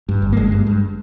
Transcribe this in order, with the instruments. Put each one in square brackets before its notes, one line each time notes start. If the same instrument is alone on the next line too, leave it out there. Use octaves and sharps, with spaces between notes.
[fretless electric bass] G2
G1
A#3
G1 G#3
G2
G2